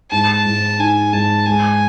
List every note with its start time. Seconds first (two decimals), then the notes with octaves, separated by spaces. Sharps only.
0.11 G#2 A5
0.45 G#2
0.79 D#4 G#5
1.13 G#2 A5
1.46 G#3 G#5